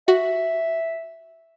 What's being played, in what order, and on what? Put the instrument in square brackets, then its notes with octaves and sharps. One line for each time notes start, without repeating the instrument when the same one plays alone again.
[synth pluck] F#4 [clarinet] E5